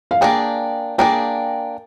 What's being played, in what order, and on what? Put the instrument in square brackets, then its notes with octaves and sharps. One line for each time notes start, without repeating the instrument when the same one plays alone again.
[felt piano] F5
[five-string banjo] A#3 D4 G#4 [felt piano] G5
[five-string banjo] A#3 D4 G#4 [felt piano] G5